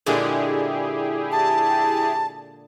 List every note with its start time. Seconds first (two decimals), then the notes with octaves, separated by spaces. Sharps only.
0.06 A#2 D3 G#3 E4 G4 G#4
1.32 A5